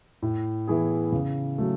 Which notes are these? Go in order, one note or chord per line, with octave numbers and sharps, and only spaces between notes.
A2
E3 B3 E4 G#4
C#3
F#3 A3